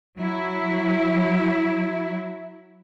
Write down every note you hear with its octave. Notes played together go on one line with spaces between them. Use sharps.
F#3 E4